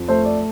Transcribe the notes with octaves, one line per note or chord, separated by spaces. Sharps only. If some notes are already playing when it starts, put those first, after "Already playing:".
Already playing: F2
A3 C5
D5